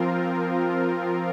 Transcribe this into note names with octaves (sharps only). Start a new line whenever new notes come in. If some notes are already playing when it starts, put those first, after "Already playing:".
Already playing: F3 C4 F4 A#4